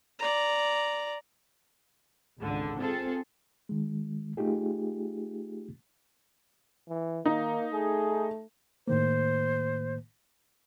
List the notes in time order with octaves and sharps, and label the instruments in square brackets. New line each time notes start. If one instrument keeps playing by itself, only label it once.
[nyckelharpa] D5 A#5
[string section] G#1 C#2 D3
C4 F4 G#4 A4
[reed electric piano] D#3 G#3
A3 D#4 F4 G4 G#4
[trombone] E3
[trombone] D#3 [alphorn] A#3 [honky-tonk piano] D#4
[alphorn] A3 [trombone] G#4
[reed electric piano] A2 D#3 A#3 [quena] C5